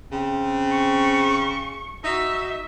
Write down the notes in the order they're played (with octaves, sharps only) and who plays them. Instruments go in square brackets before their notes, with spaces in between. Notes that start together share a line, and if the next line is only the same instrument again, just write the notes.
[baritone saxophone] C#3 [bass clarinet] C4
[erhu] C#6
[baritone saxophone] D#4 [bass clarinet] F#4 [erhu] E5